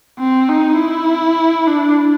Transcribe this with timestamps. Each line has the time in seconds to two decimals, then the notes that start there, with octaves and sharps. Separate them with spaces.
0.19 C4
0.49 D#4
0.78 E4
1.67 D4